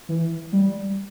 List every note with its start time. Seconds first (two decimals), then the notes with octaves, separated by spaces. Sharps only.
0.09 E3
0.53 G3